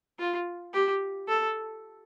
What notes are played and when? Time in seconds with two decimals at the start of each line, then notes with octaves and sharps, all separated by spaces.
0.19 F4
0.73 G4
1.28 A4